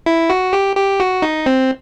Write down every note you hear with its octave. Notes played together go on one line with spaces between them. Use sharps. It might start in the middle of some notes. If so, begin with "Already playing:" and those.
E4
F#4
G4
G4
F#4
D#4
C4